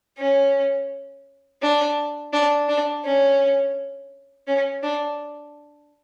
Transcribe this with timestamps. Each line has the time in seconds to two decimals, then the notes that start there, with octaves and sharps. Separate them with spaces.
0.18 C#4
1.62 D4
2.33 D4
2.68 D4
3.05 C#4
4.47 C#4
4.83 D4